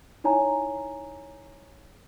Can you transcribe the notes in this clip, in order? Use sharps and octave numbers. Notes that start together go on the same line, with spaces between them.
D#4 E4 C#5 G#5 A#5